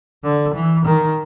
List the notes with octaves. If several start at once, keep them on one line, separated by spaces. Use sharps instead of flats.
D3
E3
D#3